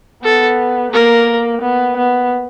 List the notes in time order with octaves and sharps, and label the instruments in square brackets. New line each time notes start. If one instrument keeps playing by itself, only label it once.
[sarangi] B3 [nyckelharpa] A4
[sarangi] A#3 [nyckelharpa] A#4
[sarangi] B3
B3